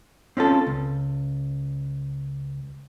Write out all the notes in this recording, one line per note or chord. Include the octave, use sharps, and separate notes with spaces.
C4 C#4 F4 A4
C#2